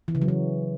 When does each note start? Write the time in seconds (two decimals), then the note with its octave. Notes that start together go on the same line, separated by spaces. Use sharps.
0.08 E3
0.15 C#3
0.22 F#3
0.28 E3